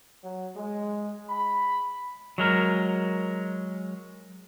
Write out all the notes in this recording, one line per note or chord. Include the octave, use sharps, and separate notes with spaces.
F#3
G#3
B5
F#3 G#3 A#4